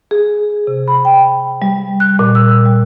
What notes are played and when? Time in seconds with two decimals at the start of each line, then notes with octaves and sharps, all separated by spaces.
0.11 G#4
0.67 C3
0.88 B5
1.05 G5
1.62 G3
2.00 F#6
2.19 A#2
2.35 E6
2.65 G3